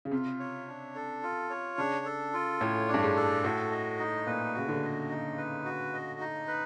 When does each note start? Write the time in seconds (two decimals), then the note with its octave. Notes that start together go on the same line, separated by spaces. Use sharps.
0.05 C#3
0.11 C3 F4
0.40 C#5
0.67 D4
0.95 A4
1.23 F4
1.50 C#5
1.78 C#3 D4
2.06 A4
2.33 F4
2.61 A2 C#5
2.88 D4
2.94 G2
3.02 G#2
3.16 A4
3.44 A2 F#4
3.71 D#5
3.99 D#4
4.27 A#2 B4
4.54 C#3 F#4
4.69 D3
4.82 D#5
5.10 D#4
5.38 B4
5.65 F#4
5.93 D#5
6.20 D#4
6.48 B4